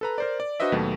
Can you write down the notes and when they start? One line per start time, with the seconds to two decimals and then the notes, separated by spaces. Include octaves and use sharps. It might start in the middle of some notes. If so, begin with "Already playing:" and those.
0.01 A4 B4 A#5
0.18 A#4 C5 D5
0.40 D5
0.60 D4 F#4 B4 C5 D#5 E5
0.72 D#2 B2 F#3 A3